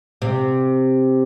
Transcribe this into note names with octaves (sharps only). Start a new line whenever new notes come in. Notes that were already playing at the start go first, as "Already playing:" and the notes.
C3